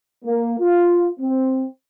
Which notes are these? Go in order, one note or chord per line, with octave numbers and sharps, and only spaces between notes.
A#3
F4
C4